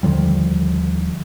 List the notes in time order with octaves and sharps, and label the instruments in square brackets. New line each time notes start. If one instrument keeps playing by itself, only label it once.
[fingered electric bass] D#2 D3 F3 G3